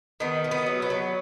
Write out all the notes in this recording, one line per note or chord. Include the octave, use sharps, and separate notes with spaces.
D#3 B3
D#3
B3
F#3
B3
F#3